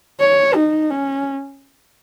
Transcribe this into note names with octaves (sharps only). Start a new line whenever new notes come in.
C#5
D#4
C#4